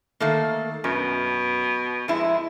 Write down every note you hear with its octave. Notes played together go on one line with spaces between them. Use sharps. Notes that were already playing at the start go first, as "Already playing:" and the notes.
D#3 A3 A#3
F#2 B2
F2 G#3 E4